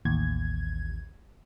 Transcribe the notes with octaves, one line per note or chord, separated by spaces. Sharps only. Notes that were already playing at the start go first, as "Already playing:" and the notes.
A1 D#2 G#6